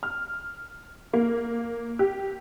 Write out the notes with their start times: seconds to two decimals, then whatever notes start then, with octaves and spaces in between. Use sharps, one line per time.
0.03 F6
1.13 A#3
1.99 G4